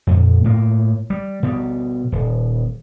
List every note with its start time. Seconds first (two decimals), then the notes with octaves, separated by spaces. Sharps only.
0.07 F2 A#2
0.44 A2 A#3
1.10 G3
1.43 B2 G3
2.12 D#1